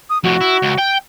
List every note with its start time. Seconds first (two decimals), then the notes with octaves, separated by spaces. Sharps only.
0.10 D#6
0.24 F2 A2 F#4
0.41 E4
0.62 C#2
0.78 G5